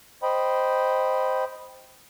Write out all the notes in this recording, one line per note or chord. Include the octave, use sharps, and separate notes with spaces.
C5 D#5 G5 B5